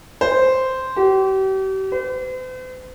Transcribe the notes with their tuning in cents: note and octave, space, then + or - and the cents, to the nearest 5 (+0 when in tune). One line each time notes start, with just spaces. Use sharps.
C5 -5
G4 -40
C5 -45